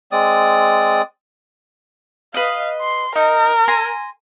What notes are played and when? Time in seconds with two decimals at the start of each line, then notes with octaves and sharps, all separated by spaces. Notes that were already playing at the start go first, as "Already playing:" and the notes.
0.12 G#3 C4 D5 D#6
2.34 B4 D#5 F5
2.81 C6
3.16 D#4 A#4
3.68 G#5 A#5 C6